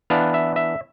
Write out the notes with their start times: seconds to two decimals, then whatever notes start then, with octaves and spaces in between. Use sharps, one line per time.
0.10 E3 B3 D4 F5
0.34 E5
0.56 E5